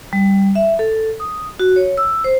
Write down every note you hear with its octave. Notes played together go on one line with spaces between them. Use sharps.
G3
E5
A4
D#6
F#4
C#5
E6
C5